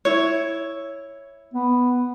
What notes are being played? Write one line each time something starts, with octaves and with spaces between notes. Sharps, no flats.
E4 C#5
B3